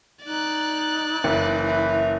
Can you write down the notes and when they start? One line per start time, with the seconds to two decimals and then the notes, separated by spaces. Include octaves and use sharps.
0.24 D#4 D5 F#6
1.24 F#1 E3